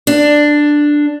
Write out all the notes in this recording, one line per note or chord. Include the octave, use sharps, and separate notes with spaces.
D4